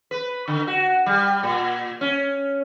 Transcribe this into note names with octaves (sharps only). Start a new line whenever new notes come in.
B4
D3
F#4
G3
A#2
C#4